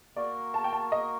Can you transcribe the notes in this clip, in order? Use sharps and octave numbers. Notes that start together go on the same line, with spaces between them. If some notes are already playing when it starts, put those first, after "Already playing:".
A#3 F#4 A#4 D5
A5
G5
A5
D#5